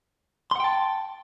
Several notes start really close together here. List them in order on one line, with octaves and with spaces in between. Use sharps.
C6 F#5 G5 A5